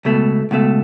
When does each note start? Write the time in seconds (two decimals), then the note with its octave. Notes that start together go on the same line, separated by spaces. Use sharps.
0.05 C#2 B2 A3
0.51 C#2 B2 A3